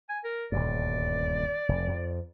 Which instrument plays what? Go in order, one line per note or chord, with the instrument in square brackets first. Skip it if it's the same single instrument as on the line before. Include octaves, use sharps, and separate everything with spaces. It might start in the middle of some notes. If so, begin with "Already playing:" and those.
[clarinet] G#5
A#4
[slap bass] D#1 D2 G2 [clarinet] D5
[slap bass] F1
F2